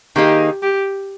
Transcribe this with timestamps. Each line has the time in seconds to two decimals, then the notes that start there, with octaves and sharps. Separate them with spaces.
0.16 D#3 A#3 D#4 G4 G#4
0.62 G4